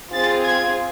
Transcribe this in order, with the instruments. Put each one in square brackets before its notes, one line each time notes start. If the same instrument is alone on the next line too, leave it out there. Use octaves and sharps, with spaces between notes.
[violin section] C4 F4 G#4 A6
G#6